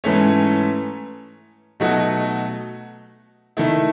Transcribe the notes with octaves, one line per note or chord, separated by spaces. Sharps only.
G#2 E3 A3 C#4
B2 F#3 A3 D#4 F#4
D#3 A3 E4